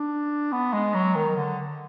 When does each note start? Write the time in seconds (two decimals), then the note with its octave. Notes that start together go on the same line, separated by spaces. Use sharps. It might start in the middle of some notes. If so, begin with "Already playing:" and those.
Already playing: D4
0.52 B3
0.73 G#3
0.94 F#3
1.15 D#3
1.36 D3